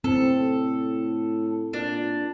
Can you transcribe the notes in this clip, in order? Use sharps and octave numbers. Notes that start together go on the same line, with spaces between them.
A2 C4 A4
A#2 D4